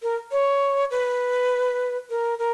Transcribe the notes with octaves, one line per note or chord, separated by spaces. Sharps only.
A#4
C#5
B4
A#4
A#4